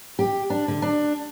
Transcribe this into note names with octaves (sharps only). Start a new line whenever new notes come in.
G4
D4
D3
D4